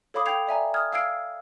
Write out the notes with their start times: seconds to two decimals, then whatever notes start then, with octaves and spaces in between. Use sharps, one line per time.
0.14 A4 C#5 F5 B5 D6 D#6
0.26 G5 G6 G#6 C7 F7
0.47 D5 E5 G#5 A#5
0.74 D#6 F6 G#6
0.92 F5 E6 F6 G#6 C7 D7